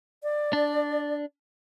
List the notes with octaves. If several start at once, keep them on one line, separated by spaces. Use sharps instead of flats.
D5
D4